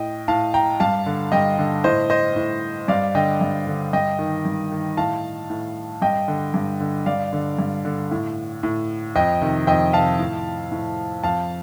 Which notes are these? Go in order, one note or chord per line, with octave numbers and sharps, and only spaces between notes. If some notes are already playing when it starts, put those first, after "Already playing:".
Already playing: A2 D#5 G5
A2 F5 A5
G5 A#5
G2 F5 A5
D3
G2 D#5 G5
D3
A2 C5 D#5
C5 D#5
A2
G2 D5 F5
D3 D#5 G5
G2
D3
G2 D#5 G5
D#3
G2
D#3
A2 F5 A5
A2
G2 D#5 G5
D3
G2
D3
G2 D5 F5
D3
G2
D3
A2
A2
F2 D#5 G5
C3 D#3
F2 D#5 G5
C3 D#3 F5 A5
A2
A2
F2 F5 A5